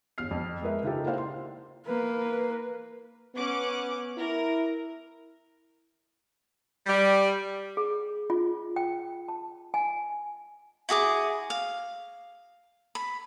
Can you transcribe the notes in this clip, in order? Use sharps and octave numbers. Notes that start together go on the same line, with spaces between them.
G1 E2 F6 C7
F2
G#3 A#4 B4 E5
C#3 D#4 F4 G4 A4
A#3 E4 C5 F5 G5
C6
A#3 B4
B3 C#4 F#5 D6
E4 A#4
G3
G#4
F4
G5
A5
G#5
E4 F#4 G#4 D6
F5
B5